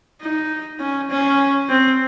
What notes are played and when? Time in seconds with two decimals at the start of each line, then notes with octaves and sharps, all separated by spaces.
0.21 D#4
0.80 C#4
1.10 C#4
1.69 C4